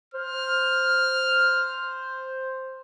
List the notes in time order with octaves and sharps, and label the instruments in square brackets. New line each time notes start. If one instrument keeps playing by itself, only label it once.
[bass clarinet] C5 [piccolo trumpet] F6